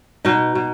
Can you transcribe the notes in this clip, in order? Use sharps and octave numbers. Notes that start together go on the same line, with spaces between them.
B2 D#4
B2